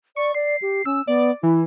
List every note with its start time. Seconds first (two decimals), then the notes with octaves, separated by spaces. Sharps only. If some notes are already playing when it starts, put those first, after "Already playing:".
0.16 D5 C#6
0.35 D5 C7
0.62 G4
0.85 C#4 E6
1.07 B3 D5
1.43 E3 E4